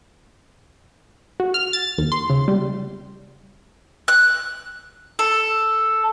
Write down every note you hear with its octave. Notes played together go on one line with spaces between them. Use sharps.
F#4
F6
A6
D#2
C6
C#3
G3
F#6
A4